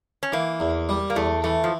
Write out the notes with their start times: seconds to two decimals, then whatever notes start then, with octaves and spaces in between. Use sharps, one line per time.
0.23 C#4
0.32 E3 A#3
0.60 E2
0.89 G3
1.10 A#3
1.16 E2 A3
1.44 E3 A3
1.64 F3